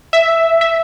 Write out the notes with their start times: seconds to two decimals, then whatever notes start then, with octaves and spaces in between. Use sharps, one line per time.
0.13 E5
0.61 E5